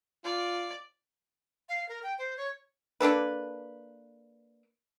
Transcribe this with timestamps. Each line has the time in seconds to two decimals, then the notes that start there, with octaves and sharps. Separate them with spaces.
0.24 F4 D5
1.69 F5
1.89 A#4
2.03 G5
2.18 C5
2.37 C#5
3.00 A#3 D4 A4 B4